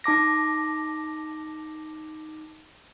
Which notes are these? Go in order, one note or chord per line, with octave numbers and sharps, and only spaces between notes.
D#4 A5 D6 A#6